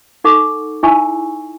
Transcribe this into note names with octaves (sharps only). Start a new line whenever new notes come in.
D#4 A4 F#5 C#6 D6
D#4 E4 E5 G#5 C#6 E6